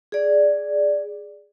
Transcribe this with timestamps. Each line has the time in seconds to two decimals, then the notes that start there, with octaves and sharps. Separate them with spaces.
0.12 G#4 D5